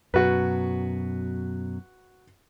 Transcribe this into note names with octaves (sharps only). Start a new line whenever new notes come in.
F#2 B2 F#3 F#4 B4